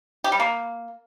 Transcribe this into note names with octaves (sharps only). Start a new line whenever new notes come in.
G4
G3
A#3